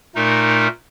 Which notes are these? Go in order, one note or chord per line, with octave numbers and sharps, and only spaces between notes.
A#2 A3 D#4 A#4